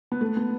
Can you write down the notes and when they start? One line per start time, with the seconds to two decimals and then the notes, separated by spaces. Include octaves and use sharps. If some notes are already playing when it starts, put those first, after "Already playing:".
0.12 B3
0.21 A3
0.37 B3